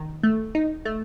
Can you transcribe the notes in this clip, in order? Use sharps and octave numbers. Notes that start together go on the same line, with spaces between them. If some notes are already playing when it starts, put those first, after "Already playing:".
Already playing: D#3
A3
D#4
A3